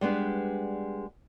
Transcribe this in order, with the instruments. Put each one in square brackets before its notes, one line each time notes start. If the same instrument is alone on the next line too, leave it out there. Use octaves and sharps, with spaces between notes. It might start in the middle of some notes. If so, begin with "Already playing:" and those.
[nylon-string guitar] G3 G#3 B3 D4